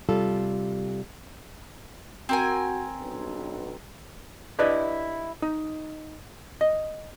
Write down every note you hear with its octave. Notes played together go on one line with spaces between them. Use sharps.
C3 G3 F4 A4
C4 F#4 A#4 G#5
B1 G2
D4 E4 G4 B4 D5 D#5
D#4
D#5